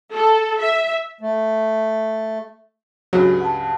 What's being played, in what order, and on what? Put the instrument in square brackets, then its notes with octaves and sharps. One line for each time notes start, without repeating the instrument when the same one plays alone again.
[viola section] A4
E5
[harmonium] A3
[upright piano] C#2 G2 C#3 [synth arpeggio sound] F#3
[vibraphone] F#5 A5